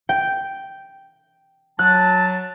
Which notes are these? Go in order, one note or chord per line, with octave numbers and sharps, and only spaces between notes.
G5
F#3 A5 F#6